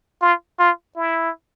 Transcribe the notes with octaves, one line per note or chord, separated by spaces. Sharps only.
F4
F4
E4